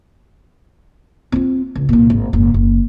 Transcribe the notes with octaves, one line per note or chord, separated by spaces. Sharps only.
C4 F4
C#2
C2 A#2
G#1
F#1 G#2
F#1